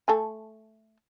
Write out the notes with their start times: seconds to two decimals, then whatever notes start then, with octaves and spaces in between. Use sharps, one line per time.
0.08 A3 A4 G#5